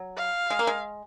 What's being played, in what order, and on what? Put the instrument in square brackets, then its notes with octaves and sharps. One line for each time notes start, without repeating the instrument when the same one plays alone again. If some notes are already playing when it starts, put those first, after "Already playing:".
Already playing: [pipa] F#3
[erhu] F5
[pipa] G#3
A#3
G#3